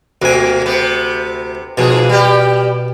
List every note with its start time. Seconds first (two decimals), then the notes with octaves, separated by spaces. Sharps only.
0.22 D2 B2 A#3 G#5
0.66 C3 B3
1.77 G#2 B2 F3 G#4
2.09 G3 G4